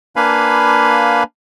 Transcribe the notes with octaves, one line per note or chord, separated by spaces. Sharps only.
A#3 D4 B4 F5 G#5 B5